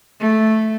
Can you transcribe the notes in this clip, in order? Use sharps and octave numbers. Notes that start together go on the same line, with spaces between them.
A3